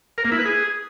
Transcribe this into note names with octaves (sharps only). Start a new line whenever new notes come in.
A#4
A#3
E4
B4
G#4